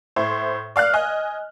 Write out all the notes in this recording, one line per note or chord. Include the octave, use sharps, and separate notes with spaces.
A2 E4 C5
D5 F5 F6 F#6
D#5 G#5